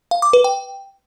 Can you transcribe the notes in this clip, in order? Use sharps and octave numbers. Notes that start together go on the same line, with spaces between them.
F5
D6
B4
G5